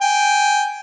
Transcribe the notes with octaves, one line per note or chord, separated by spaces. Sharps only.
G5 G#5